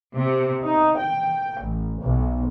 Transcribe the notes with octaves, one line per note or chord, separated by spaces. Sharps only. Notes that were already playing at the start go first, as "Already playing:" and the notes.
C3
D#4
G5
A1
B1